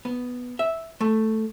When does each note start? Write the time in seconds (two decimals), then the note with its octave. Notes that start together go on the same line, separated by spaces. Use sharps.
0.05 B3
0.59 E5
1.01 A3